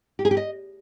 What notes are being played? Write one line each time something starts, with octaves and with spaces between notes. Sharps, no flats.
G4
G#4
G4
D#5